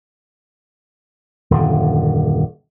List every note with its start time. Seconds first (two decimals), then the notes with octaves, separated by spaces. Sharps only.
1.51 D#1 F#2 D3